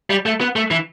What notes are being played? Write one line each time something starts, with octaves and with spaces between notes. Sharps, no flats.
G3
A3
B3
A3
E3